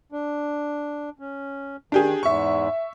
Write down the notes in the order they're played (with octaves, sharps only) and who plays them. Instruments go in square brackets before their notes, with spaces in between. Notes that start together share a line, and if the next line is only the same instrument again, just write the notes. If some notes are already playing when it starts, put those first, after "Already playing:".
[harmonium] D4
C#4
[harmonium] D#3 [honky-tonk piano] D4 G4 G#4
[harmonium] E2 G#2 [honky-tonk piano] E5 C#6